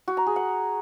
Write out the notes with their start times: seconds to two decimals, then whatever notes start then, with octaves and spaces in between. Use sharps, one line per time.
0.08 F#4
0.17 A#5
0.26 G#4
0.36 F#5